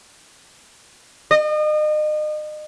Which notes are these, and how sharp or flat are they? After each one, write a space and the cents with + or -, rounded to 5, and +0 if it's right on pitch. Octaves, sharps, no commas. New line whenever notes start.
D#5 -35